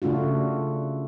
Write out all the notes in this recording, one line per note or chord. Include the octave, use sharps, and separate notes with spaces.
C#3 A3 D4 F4 F#4